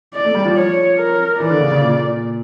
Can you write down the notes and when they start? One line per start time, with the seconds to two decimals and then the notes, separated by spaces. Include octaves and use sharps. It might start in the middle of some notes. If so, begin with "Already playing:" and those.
0.14 D5
0.25 A3
0.35 G3
0.46 F3
0.56 C#5
0.98 A#4
1.39 E3 D5
1.50 D3
1.60 C#3
1.71 C#3
1.82 A#2